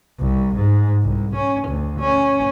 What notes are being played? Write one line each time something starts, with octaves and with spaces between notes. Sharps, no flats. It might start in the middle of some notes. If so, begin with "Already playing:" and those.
C2
G#2
C2
C#4
D2
C#4